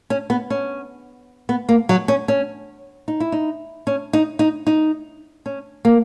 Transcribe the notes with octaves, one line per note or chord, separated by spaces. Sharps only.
C#4
B3
C#4
B3
A#3
F#3
C#4
C#4
D#4
E4
D#4
C#4
D#4
D#4
D#4
C#4
A#3